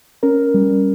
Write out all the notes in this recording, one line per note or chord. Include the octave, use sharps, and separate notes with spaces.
C#4 A#4
G3